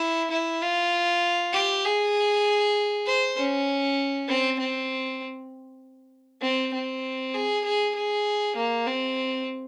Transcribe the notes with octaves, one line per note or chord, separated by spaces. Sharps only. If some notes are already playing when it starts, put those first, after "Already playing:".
Already playing: E4
E4
F4
G4
G#4
C5
C#4
C4
C4
C4
C4
G#4
G#4
G#4
A#3
C4